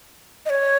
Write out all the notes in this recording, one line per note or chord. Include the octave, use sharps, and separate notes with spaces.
D#5
C#5